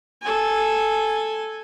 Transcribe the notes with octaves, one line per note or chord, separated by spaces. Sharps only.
A4 G#5